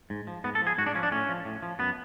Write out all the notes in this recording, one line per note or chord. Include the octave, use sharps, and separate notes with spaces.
G#2
F3
G#2 B3
A4
F3
G#4
G#2 F#4
D4
F3 C#4
D4
A2 C#4
F3
A2
F3
F#2 B3